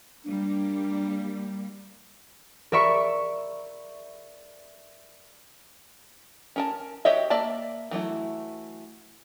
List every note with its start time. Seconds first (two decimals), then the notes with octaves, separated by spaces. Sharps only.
0.24 G3 A#3 D4
2.72 A#4 D5 E5 B5 C#6
6.56 C#4 A#4 A5
7.05 F#4 G4 C#5 D#5 E5
7.30 A#3 D5 E5 A5
7.91 E3 F#3 A3 E4